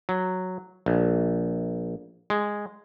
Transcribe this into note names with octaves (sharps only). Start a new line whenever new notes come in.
F#3
A#1
G#3